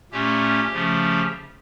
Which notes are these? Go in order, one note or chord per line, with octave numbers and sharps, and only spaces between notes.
A#2 A3 C#4 G4
C#3 F3 A3 C#4